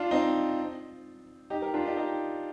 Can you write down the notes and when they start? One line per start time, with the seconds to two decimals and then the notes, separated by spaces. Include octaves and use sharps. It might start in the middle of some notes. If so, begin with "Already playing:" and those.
Already playing: D4 F4
0.11 C4 D#4
1.50 D#4 G4
1.62 G4 A#4
1.74 D4 F4
1.86 D#4 G4
1.97 D#4 G4